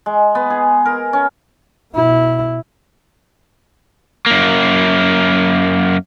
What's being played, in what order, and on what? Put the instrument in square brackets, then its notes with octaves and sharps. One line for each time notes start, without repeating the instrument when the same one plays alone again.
[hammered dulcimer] G#3
B3
G#4
A#4
C#4
[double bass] B2 E4
[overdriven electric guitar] F#2 A#3